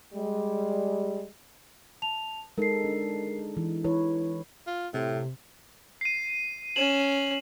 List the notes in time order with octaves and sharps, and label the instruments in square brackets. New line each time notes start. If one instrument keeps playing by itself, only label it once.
[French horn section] G3 G#3
[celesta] A5 F7
[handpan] G#3 D#4 A4 [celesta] A#4 C7
[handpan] D4
E3
[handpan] E3 B4 C#5 [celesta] E4
[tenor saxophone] F4
[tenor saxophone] A2 [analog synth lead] C3
[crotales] C7 D#7
[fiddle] C#4 [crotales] E7 F#7